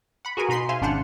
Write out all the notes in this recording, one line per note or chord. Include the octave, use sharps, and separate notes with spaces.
F#5 B5
F#4 G#4 A#4 B4 G#5
B2 D#4 B5 C6 C7
C5 E5 F5 G#5 C6
G#1 C#3 D4 C5 F#5 F6